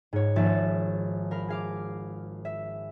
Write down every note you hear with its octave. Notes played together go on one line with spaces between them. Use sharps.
G#2 C#5
G#1 F3 E5 A6
A#4 F5 B5
G#4 F5 D6
E5